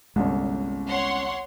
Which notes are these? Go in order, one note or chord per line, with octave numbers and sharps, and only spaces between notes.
G1 C2 G#3 C#4
C#5 F#5 C6